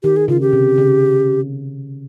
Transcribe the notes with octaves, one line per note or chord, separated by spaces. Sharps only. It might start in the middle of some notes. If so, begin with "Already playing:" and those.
D#3 G4
G#4
C#3 F4
G4
C3
C#3